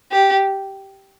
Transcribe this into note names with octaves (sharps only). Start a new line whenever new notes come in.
G4